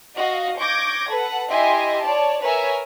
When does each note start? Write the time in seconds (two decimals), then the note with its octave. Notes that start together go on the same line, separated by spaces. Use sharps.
0.16 F#4 D#5 F5
0.59 C#6 D6 G6 G#6 A#6
1.10 A4 B4 F#5
1.50 E4 G4 D#5 E5 G#5 C6
2.03 C#5 D5 A5
2.41 A#4 B4 C#5 E5 G#5